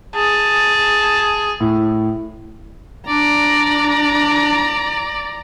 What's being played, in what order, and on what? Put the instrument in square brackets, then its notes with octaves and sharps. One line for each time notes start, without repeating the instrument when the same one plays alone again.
[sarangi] G#4 [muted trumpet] A5
[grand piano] A2
[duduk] D4 [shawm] D5 [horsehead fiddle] A#5